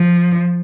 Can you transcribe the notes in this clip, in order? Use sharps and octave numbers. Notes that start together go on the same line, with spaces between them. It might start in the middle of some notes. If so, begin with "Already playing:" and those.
Already playing: F3